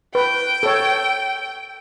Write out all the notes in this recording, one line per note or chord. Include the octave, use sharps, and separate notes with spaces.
B4 G5
A4 C#5